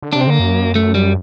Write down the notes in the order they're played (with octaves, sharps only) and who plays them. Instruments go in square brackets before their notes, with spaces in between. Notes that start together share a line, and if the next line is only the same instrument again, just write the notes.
[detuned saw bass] D3
[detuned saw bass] C3 [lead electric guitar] D4
[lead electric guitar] C4
[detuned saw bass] D3 [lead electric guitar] A#3
[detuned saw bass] F#2
[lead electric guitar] A3
G3